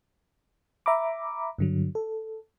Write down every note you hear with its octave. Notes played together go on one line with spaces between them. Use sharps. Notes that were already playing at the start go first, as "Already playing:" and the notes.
E5 A#5 B5 D6
G2 D3 F#3
A4